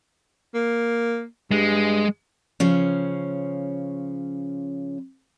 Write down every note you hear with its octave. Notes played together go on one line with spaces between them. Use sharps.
A#3
G2 G#3
C#3 F3 C#4